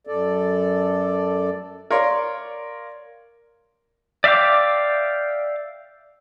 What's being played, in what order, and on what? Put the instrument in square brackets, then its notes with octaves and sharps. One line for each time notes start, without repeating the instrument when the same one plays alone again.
[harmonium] F#2 A4 D5
[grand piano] A#4 C#5 D5 F5 C6
[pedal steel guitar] D5 E5 F5 G5 D6